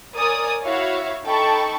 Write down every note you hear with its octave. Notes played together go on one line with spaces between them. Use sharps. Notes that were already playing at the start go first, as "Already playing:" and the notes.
A#4 C#5 D5 G#5 D#6
E4 F#4 C#5 E5 F5
D#4 A4 G5 A5 B5 C#6